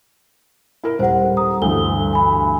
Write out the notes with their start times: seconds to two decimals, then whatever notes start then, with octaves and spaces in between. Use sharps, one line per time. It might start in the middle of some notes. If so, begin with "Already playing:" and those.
0.84 E4 A#4
0.99 D#1 C5 F#5
1.37 A#5 D#6
1.62 D2 G2 E3 G7
2.13 G#5 B5